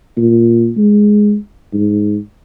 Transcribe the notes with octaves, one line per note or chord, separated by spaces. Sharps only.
A#2
G#3
G#2